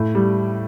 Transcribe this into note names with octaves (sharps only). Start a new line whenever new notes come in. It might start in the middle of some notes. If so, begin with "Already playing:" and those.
Already playing: A2
G3